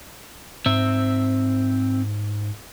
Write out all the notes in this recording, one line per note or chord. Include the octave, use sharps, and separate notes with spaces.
G#2 C4 E5